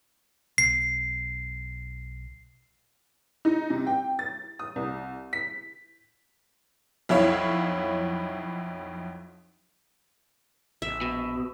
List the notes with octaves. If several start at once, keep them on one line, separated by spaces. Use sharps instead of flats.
B1 C7
D#4
C3
G5
A6
D#6
C2
B6
B1 F2 E4 C#5 F5
A#1 E5
B2